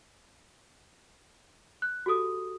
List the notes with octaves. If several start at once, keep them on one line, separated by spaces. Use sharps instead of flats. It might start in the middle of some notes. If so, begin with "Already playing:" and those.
F#6
F#4 G4 A4 D#6